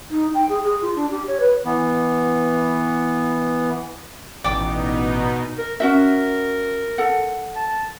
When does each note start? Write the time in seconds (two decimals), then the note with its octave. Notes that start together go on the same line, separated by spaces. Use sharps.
0.11 D#4
0.35 G5
0.49 G#4
0.63 G#4
0.82 F4
0.96 D4
1.11 G4
1.28 C#5
1.40 B4
1.65 E3 B3
4.44 A1 B2 B3 D#4 D5 G5 D6
5.58 A#4
5.80 C#4 F#4 A#4 E5
6.98 A4 F#5
7.56 A5